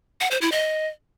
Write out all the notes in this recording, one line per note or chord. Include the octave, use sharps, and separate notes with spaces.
F#5
C5
E4
D#5